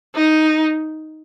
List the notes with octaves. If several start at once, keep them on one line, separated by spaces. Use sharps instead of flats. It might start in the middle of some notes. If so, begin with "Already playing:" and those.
D#4